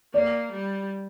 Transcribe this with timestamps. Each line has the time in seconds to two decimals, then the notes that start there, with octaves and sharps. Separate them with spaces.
0.13 A#3 D5
0.51 G3